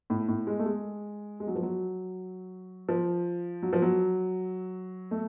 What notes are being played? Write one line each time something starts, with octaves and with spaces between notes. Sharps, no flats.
A2
A2
G#3
A3
G#3
G#3
F#3
F3
F#3
F3
F#3
F3
F#3
A3